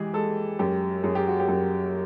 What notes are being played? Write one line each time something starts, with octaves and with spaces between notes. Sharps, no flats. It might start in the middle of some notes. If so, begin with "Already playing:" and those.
Already playing: E3 G#3 G4 G#4
G#3 A4
F#2 G4
F#2 G#4
G4
F#4
G4
F#2